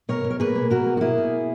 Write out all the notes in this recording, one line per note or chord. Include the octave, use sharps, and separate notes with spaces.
B2 A#4 C#5
B2
A#4
A#3 G#4 B4
A#3
B2 F#4 A#4
A#3
F#4
A#3 E4 G#4
B2